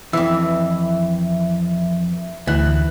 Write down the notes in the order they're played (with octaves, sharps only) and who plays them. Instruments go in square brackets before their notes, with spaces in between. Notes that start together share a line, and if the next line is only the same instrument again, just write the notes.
[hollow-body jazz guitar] F2 E3 [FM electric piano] E5
[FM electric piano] D2 F#6 [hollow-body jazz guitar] E3